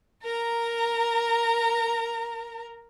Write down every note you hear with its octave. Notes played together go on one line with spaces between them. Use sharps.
A#4 A#5